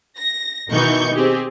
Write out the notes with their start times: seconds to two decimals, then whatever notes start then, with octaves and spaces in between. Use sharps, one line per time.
0.17 A#6
0.70 B2 D#3 E3 D#4 C#6 G6
1.13 C4 G4 G#4